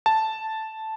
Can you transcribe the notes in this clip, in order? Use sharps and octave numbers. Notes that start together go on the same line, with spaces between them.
A5